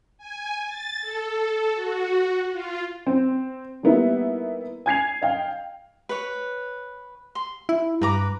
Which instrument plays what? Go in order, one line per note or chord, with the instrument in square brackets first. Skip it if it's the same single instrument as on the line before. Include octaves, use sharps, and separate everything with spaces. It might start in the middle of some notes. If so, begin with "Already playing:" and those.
[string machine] G#5
A6
A4
F#4
F4
[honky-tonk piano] C4
G3 A#3 B3 D#4 E4
G#5 G#6 C7 F7
D#5 F5 G5
[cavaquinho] B4 C#5
C6
[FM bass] E4
[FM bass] G2 [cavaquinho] B4 A#5 D6